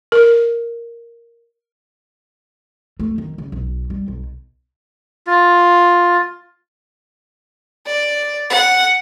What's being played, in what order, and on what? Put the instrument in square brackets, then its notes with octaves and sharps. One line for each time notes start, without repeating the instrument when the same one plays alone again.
[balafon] A#4
[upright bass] A3
D#3
C#3
B1
G3
B1
[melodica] F4
[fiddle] D5
F#5